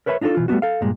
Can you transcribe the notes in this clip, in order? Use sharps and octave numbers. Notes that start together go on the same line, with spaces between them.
A#4 B4 C#5 E5 A5 B5
D4 D#4 F4 F#4 A4
B2 E3 F4
G3 A3 B3 D4 F#4
A4 F5
G2 A#2 G#3